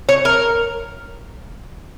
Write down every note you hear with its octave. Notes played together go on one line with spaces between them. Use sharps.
C#5
A#4